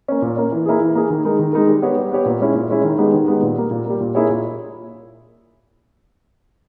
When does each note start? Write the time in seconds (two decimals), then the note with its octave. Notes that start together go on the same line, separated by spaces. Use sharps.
0.08 A#3 C#4
0.22 A#2
0.37 A#3 C#4
0.52 E3
0.66 A#3 E4 G#4
0.80 E3
0.95 A#3 E4 G#4
1.10 D#3
1.24 G#3 D#4 A#4
1.39 D#3
1.53 G#3 D#4 A#4
1.68 G3
1.82 B3 G4 C#5
1.96 G3
2.12 B3 G4 C#5
2.25 A#2
2.40 G#3 C#4 E4
2.54 A#2
2.70 G#3 C#4 E4
2.84 D#3
2.98 G#3 B3 D#4 G4
3.14 D#3
3.28 G#3 B3 D#4 G4
3.42 A#2
3.56 G3 A#3
3.71 A#2
3.86 G3 A#3
4.01 A#2
4.15 A#3 E4 G#4 C#5
4.29 A#2